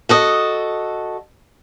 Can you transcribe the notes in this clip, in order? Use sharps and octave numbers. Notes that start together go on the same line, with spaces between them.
F#4 A4 D#5